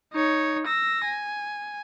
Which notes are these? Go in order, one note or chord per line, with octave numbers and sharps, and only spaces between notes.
D#4 C#5
E6 A#6
G#5